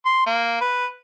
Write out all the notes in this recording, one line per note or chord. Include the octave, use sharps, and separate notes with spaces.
C6
A#3
B4